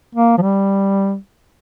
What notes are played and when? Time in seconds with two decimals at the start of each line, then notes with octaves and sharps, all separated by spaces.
0.15 A#3
0.38 F3
0.41 G3